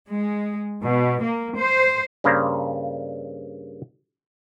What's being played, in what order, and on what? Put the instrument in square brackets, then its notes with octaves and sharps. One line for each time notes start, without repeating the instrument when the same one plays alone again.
[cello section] G#3
B2
A#3
C5
[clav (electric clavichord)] G2 C#3 A#3 C5 D5 A#5